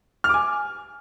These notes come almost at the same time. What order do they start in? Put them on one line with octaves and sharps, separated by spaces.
F6 D6 G#5